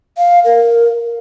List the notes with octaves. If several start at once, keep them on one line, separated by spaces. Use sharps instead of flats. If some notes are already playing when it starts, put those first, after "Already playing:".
F5
A#4